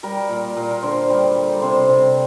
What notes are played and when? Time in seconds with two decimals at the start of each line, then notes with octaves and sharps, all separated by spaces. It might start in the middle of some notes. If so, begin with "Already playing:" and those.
0.03 G3 A#4
0.29 A#2
0.57 A#2
0.71 A#4
0.82 D3 C5
1.10 G3
1.36 G3
1.62 C3 C5
1.89 C3